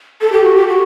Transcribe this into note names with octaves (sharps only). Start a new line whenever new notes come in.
A4
G4
F#4
G4
F#4